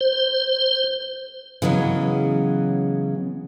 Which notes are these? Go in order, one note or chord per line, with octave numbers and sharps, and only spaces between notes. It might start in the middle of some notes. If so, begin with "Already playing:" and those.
C5
C#3 E3 F#3 G#3 B3 C#4